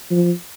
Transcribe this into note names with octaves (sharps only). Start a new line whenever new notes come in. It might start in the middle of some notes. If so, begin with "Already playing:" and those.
F3